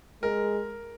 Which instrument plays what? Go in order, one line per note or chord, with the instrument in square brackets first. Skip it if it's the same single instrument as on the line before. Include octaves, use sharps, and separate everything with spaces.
[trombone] G#3 [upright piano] A#4